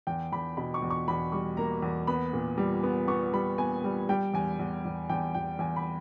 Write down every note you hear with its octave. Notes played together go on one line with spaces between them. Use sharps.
E2 G5
E2 B5
B2 B5
C#6
E2
C#6
E2 B5
G3 C#6
A#3 A#5
E2
B3 B5
A#2
G3
B3
B3 C#6
G3 B5
B3 G#5
G3
G3 G5
E2 G#5
E2
E2
E2 G5
E2 G5
E2 G#5
B5